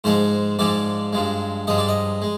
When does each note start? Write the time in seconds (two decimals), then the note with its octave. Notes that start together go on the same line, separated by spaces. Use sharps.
0.04 G#2 F3 G#3 C5
0.59 G#2 F3 G#3 D5
1.13 G2 F3 G#3
1.67 G2 F3 G#3 D#5
1.78 D5
1.88 D#5
2.22 G#3